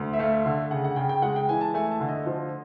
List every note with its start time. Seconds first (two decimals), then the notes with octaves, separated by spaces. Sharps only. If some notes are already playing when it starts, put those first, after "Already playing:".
Already playing: D2
0.13 E5
0.19 A3 F5
0.45 D3
0.71 C#3 F#5
0.84 F#5
0.96 C#3 G5
1.09 G5
1.22 G#3 F#5
1.36 G5
1.48 E3 G#5
1.61 A5
1.74 A3 G#5
1.91 A5
2.00 D3
2.09 D#5
2.26 F3